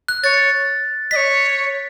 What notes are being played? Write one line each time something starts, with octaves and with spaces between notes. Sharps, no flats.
F#6
C#5 A6
D#5 B6
C#5